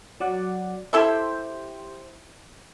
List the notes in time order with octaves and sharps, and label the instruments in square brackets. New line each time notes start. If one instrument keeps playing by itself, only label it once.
[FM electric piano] F#3 D5 F#5
[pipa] E4 A4 E5 [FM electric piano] G4 C5 G5